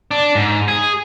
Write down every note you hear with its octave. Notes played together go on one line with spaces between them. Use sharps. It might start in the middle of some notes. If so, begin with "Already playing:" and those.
D4
G#2
G#4